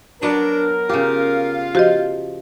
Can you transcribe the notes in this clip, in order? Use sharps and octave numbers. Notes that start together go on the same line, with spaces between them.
F#3 B3 D4 A#4
C#3 F4 G4 F5
F3 F#4 G4 D#5